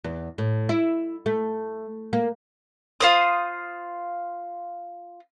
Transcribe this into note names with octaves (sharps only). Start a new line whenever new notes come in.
E2
A2
E4
A3
A#3
F4 C5 D#6